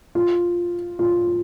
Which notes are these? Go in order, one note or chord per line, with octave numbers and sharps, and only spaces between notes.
F4
F4